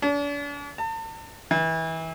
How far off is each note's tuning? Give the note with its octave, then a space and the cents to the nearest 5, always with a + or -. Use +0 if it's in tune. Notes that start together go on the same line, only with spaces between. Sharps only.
D4 -40
A5 +40
E3 -25